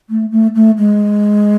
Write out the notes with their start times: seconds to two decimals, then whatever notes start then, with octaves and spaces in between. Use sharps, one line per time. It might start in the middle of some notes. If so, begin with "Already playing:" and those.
0.10 A3
0.31 A3
0.55 A3
0.78 G#3